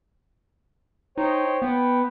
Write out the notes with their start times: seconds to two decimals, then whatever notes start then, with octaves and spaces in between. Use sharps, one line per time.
1.18 D#4 C5 C#5 G5
1.62 B3 G5